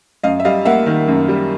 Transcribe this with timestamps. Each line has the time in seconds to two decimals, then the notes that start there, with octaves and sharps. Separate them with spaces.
0.24 F#2 D#5 F5
0.40 E5
0.45 G3 D#5 F5
0.65 A#3 E5 F#5
0.86 D#3
1.08 F#2
1.28 G3